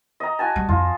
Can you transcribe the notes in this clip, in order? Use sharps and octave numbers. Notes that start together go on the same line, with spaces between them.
D#5 A#5
F#4 G#5 A5
G3
F2 F4